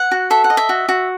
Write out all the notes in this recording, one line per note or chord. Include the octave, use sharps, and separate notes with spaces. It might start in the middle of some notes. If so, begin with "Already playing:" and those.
Already playing: F#5
F#4
A4 E5
F#5
D#5
E5
F#4
F#4